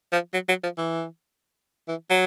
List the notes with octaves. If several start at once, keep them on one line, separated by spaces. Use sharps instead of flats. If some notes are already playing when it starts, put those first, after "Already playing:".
F3
F#3
F#3
F3
E3
E3
F#3